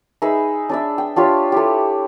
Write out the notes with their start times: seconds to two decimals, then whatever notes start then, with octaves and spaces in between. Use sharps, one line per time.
0.22 D#4 G#4 B4 E5
0.69 D4 D5 E5
0.98 G5
1.16 D4 F4 G4 C#5
1.52 A3 E4 G4